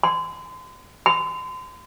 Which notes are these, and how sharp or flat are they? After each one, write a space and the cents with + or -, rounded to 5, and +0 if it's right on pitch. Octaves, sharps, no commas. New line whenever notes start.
C6 -35
C6 -40